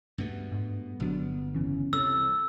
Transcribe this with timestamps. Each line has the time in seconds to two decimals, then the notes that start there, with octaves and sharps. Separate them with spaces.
0.18 G2 B2 A3 B3
0.52 G#2
1.00 G1 B2 F#3 D4
1.54 E2 C#3 E3 C#4
1.93 C2 A4 C#5 E6 A6